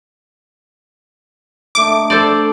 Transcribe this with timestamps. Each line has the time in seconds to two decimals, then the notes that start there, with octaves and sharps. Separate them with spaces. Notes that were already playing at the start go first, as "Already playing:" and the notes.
1.75 D3 A3 D#4 D6
2.10 A4 C5 D5